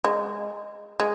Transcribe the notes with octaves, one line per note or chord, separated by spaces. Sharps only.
G#3
G#3